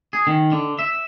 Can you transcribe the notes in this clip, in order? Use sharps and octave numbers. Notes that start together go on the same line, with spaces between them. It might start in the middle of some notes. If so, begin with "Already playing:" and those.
G#4
D#3
D3
E5